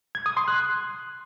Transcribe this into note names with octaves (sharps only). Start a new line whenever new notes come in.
G#6
D#6
C6
F#6